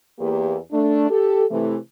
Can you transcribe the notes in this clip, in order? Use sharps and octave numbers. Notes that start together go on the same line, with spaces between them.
E2 A#3 G4
A3 D4
G4 A4
C3 E3 A3